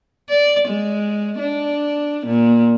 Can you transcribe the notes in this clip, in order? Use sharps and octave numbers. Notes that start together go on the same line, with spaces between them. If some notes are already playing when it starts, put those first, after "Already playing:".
D5
G#3
D4
A#2